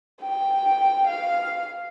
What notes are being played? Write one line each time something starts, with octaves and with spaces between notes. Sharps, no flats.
G5
F5